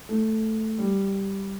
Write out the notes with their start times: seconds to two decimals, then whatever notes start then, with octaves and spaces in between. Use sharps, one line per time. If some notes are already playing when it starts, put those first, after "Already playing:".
0.09 A3
0.78 G3